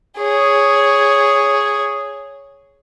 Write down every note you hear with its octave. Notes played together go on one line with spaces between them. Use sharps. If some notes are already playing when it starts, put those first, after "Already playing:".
G#4 C#5